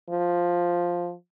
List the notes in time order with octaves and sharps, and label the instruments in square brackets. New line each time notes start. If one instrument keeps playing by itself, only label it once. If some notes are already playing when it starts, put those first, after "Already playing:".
[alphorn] F3